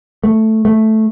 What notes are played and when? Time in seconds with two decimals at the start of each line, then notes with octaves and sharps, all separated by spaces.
0.24 A3
0.65 A3